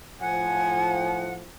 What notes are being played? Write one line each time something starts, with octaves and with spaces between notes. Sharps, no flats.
A2 F3 F#5 G#5